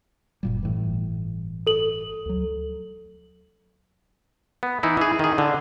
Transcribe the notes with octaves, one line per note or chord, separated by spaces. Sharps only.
F#1 A#2 G3
G1 A2 E3
A4 F#7
D2 F#3
B3
E3 D#4 E4
E3 G#4
D#3 G#4
D3